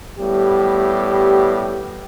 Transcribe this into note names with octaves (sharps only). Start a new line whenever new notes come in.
A2 G3 B3 G4